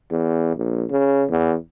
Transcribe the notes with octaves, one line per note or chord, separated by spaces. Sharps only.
E2
A#1
C#3
E2